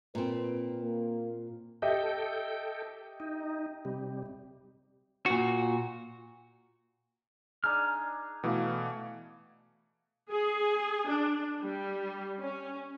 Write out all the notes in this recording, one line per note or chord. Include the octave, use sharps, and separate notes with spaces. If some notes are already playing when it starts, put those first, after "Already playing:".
A#2 C4 B4
A#3
G4 A4 D#5 E5 G5
D#4
C3 G3
A#2 F#4
D4 D#4 G#4 F6
B2 E3 A3 F5 D6
G#4
D4
G3
C#4